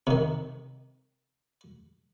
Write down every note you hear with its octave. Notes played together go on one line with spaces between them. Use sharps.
C3 D#3